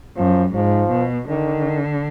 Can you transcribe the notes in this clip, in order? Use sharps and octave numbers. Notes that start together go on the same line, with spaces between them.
F#2 F3
G#2 F3
B2
D3 D#3